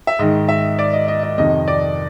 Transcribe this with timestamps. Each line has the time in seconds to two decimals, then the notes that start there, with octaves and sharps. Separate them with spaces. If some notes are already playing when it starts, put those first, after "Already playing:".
0.07 E5
0.19 G#2 D#3 D#5
0.49 E5
0.79 D5
0.93 D#5
1.08 D#5
1.23 D#5
1.38 F2 C3 D#3 D#5
1.68 D5